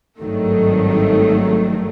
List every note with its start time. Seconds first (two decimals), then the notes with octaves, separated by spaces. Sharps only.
0.18 G#1 G2 D#3 F#3 A3